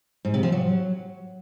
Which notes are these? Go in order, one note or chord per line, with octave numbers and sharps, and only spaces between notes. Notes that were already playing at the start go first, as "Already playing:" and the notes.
G#2
C3
F3
F#3